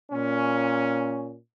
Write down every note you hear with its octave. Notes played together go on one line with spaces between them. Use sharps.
A#2 C#4